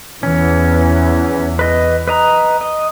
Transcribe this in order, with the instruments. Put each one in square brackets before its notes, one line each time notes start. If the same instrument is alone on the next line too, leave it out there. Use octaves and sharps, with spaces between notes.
[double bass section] E2 E3 [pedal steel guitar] C#4
[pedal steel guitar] B4 D#5
B4 D#5 A#5
D#5